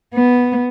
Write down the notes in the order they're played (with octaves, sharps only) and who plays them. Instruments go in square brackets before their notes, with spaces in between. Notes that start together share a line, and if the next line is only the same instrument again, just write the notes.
[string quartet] B3